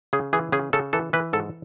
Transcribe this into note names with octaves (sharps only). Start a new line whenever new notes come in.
C#3 G#4
E3 G#4
C#3 G#4
C#3 A4
E3 A4
E3 B4
G#2 A4